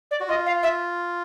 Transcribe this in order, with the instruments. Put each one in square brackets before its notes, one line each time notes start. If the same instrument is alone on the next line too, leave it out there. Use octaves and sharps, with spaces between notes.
[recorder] D5
[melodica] F#4
[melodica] F4 [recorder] D#5
[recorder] F5
E5